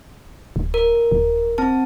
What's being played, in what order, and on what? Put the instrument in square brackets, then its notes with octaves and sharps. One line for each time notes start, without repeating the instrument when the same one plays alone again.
[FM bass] D1
[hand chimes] A#4
[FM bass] D#1
[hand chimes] C4 A5